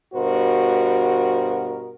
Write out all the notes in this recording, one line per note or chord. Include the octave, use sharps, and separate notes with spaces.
G2 B2 F#4 A#4 C5